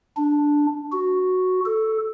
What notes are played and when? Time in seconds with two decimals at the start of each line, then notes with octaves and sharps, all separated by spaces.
0.17 D4
0.92 F#4
1.66 A4